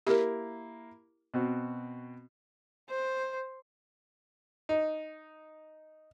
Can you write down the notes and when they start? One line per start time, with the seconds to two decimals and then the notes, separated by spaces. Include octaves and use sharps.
0.07 A#3 E4 G4 A#4
1.34 B2 C4 F#4
2.90 C5
4.69 D#4